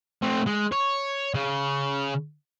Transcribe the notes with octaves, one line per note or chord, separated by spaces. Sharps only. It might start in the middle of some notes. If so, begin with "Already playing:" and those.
A3 C4
G#3
C#5
C#3